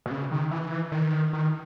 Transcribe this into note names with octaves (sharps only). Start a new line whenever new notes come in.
B2
C#3
D#3
E3
D#3
D#3